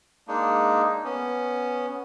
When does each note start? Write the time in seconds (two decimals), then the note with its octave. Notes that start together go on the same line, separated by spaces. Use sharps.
0.28 G#3 A#3 D4 D#4
1.04 B3 C#4